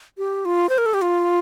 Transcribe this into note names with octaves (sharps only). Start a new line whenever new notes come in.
G4
F4
C5
A#4
A4
G4
F4